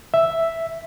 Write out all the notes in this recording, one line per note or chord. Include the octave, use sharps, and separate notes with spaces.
E5